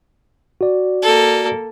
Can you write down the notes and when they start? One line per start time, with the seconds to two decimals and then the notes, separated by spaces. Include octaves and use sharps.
0.61 F#4 D5
1.02 A#3 A4